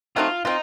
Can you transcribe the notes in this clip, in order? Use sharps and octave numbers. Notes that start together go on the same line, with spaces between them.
F#3 A3 C4 D#4 F4
C4 D#4 F4